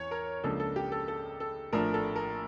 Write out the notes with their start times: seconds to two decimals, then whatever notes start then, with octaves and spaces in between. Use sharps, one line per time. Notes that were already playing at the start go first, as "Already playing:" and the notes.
Already playing: E2 E3 C#5
0.11 A#4
0.44 C#2 C#3 F3 A#3 D4 A4
0.60 A4
0.76 G4
0.92 A4
1.08 A4
1.40 A4
1.73 A#1 A2 F3 A3 D4 A#4
1.94 A4
2.16 A#4